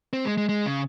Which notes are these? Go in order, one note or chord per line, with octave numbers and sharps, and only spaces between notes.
C4
G#3
G#3
G#3
C#3